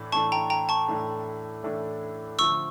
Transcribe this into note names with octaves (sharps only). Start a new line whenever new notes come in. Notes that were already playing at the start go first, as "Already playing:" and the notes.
Already playing: A2 E3 D4 A4
A2 E3 A3 D4 A4 A5 C#6
G5 A#5
G5 A#5
A5 C#6
A2 E3 A3 D4 A4
A2 E3 A3 D4 A4
D3 F3 A3 C#6 E6